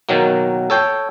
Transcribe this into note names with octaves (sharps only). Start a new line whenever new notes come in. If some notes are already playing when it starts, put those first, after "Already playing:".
B2 D#3 F#3 A#3
A4 C#5 G5